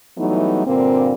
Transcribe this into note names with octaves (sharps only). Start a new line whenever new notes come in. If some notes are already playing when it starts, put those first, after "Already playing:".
E3 F#3 G3 A3 B3 D#4
G2 A#2 D3 A#3 C4